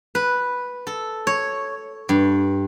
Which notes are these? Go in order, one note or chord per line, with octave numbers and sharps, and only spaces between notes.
B4
A4
C#5
G2